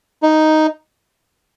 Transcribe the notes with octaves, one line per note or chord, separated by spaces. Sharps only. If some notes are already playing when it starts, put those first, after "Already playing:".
D#4